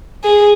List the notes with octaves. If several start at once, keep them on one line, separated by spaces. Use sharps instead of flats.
G#4